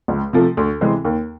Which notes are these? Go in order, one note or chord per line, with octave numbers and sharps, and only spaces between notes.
C#2
C3 F3 A3
D2
C3 E3 G#3 C4
D#2